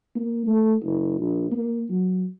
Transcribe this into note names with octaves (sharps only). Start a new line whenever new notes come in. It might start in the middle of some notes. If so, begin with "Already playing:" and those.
A#3
A3
F#1
A#1
A#3
F#3